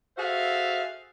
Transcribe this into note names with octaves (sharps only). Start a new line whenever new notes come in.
F#4 G#4 A4 C5 E5 F5